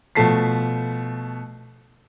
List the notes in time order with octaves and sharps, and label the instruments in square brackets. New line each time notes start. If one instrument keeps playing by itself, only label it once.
[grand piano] B2 F3 A3 A5 B6 C7